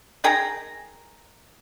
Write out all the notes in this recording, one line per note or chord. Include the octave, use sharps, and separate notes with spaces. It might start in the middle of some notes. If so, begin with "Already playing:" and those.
D#3 G#4 G5 A#5